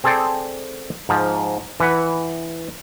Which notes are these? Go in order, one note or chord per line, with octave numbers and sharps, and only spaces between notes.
C4 G#4 A4 C5 D5 G5
G#2 F3
E3 B4 F#5